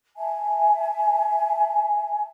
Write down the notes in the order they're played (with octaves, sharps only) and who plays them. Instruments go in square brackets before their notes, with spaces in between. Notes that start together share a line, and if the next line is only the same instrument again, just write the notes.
[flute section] E5 G#5 A5